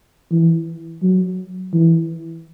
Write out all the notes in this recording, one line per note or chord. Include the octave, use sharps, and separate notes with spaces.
E3
F#3
E3